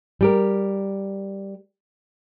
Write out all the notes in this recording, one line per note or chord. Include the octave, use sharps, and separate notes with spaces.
G3 G4 A#4